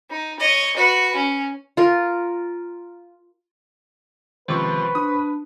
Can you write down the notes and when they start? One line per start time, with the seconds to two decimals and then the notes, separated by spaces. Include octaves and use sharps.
0.10 D#4
0.40 C#5 D#5
0.77 F#4 B4
1.16 C#4
1.77 F4 A#4
4.48 C#2 C3 D#3 F3 B4 C5 C#6
4.95 D4 D#6